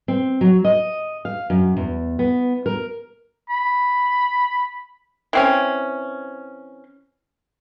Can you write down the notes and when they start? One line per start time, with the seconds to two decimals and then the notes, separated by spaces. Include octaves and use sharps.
0.08 C4
0.41 F#3
0.65 D#5
1.25 F5
1.50 F#2
1.77 E2
2.19 B3
2.66 A#4
3.49 B5
5.33 E3 C4 C#4